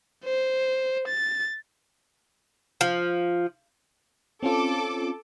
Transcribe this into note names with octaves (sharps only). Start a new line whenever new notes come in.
C5
A6
F3
C4 C#4 F4 A4 D6